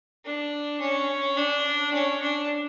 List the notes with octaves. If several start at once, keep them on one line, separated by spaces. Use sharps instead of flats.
D4
C#4
D4
C#4
D4